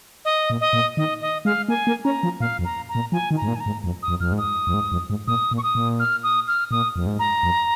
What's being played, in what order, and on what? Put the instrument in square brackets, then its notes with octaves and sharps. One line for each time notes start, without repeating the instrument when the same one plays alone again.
[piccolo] D#5
[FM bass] A#2
[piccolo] D#5
[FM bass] A#2
[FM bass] D#3 [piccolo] D#5
[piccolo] D#5
[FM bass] G#3 [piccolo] F5
[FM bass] A#3 [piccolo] G#5
[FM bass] A#3
[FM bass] C#4 [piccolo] A#5
[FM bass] F3
[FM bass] A#2 [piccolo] F5
[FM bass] F2
[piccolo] A#5
A#5
[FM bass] A#2
[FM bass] F3 [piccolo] G#5
[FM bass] D#3
[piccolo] A#5
[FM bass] G#2
A#2
[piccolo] G#5
A#5
[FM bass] G#2
F2
[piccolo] D#6
[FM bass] F2
[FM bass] F2 [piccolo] F6
[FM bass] G#2
[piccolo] D#6
[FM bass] F2
G#2
F2
G#2
[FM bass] A#2 [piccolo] D#6
[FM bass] A#2
[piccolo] C#6
D#6
[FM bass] A#2
[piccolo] F6
D#6
F6
[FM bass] A#2 [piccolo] D#6
[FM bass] F2
G#2
[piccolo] A#5
[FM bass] F2